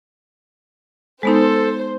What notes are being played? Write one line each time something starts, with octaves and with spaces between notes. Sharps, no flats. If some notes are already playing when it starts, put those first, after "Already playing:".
G#3 B3 D#4 A4 C5